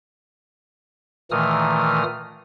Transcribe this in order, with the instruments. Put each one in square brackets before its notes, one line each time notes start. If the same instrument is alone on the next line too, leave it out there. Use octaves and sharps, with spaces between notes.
[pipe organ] A#2 D#3 E3 A3 D#6 F6